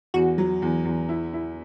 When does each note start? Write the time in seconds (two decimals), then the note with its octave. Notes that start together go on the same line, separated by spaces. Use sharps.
0.14 E2 F#4
0.38 F#3
0.62 E2
0.85 E2
1.09 E4
1.33 E4